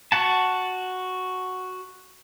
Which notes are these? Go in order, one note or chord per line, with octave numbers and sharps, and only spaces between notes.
F#4 F#5 A5